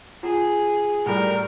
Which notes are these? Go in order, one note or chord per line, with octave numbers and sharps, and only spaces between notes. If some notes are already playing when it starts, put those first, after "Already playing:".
F4 G#4 F#5 A#5
A2 G3 A#4